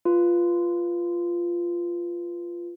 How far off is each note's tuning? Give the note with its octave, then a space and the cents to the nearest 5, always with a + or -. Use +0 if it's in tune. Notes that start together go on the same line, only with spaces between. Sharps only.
F4 -10 B4 +0